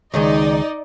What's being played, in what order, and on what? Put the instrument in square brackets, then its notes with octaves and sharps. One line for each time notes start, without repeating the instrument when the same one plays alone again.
[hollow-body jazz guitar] C#2 D#3 G#3 [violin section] D#4 D5 D#5